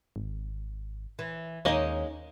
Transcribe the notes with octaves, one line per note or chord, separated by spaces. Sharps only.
G#1
E3
D#2 G#3 A#3 C#4 D#4 D#5